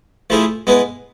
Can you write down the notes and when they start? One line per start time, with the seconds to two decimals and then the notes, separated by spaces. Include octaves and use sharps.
0.30 F3 A3 E4 G#4 C5
0.67 G#3 B3 E4 B4